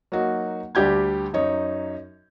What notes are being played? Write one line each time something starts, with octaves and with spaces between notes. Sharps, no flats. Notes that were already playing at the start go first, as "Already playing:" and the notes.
F#3 A#3 D#4 F#4
D2 G3 D4 G4 G6 G#6
F#2 D#4 C#5